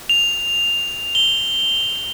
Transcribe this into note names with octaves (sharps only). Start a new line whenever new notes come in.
F7
G7